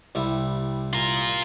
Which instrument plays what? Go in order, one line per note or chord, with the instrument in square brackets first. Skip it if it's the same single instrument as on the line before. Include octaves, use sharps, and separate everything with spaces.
[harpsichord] C2 G3 E4
[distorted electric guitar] F4 A#4